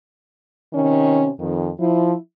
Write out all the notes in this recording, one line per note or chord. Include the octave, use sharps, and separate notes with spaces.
C3 D#3 C#4
F2 D#3
F3 E4